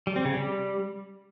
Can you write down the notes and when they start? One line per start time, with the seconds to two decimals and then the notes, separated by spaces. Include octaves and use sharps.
0.07 G3
0.16 C4
0.25 C#3
0.34 G3